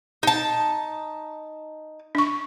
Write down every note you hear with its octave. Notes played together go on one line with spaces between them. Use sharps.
D#4 A5
D4 C#6